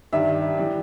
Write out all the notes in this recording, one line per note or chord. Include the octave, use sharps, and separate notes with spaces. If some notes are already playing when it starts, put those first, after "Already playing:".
G2 D#3 G3 E5
E3 G3